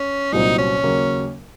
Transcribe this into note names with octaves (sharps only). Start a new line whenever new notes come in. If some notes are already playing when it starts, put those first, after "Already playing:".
Already playing: C#4
C2 A#2 F#3 C4 D#4
C#4
D#2 C#3 F#3 A#3